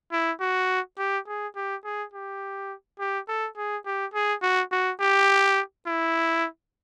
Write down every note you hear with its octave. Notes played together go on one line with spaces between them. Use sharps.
E4
F#4
G4
G#4
G4
G#4
G4
G4
A4
G#4
G4
G#4
F#4
F#4
G4
E4